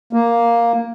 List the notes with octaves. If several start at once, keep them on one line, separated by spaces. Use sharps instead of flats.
A#3